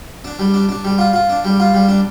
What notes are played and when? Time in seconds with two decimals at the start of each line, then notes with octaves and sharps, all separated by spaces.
0.25 D4
0.39 G3
0.54 D4
0.69 D4
0.84 G3
0.98 F4
1.13 F4
1.30 D4
1.44 G3
1.60 F4
1.74 G3
1.89 D4